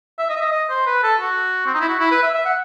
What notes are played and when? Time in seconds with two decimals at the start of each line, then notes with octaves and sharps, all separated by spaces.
0.18 E5
0.30 D#5
0.36 E5
0.41 D#5
0.52 D#5
0.69 C5
0.86 B4
1.03 A4
1.20 F#4
1.66 C4
1.74 D#4
1.81 E4
1.89 F#4
1.99 E4
2.11 B4
2.23 E5
2.34 E5
2.45 F#5